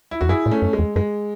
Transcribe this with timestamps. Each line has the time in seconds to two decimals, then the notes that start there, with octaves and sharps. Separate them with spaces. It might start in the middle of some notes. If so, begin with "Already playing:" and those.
0.11 E4
0.21 E2 F#4
0.29 F#2 E4 G#4
0.46 A2
0.51 A3 C#4
0.62 F#2
0.73 G#3
0.79 E2
0.96 F#2 G#3